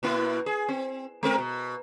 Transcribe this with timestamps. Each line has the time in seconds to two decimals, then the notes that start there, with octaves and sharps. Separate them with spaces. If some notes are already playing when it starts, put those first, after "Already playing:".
0.03 B2 A#3 E4
0.46 G#4
0.69 C4
1.23 G#3 C4 A#4
1.38 B2